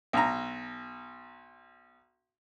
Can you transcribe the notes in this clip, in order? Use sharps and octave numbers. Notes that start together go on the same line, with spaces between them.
B1 A#5